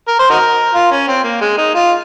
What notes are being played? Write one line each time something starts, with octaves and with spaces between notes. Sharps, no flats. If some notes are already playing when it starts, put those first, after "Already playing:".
A#4
C5
D#4 F#4 A#4
F4
C#4
C4
A#3
G#3
D#4
F4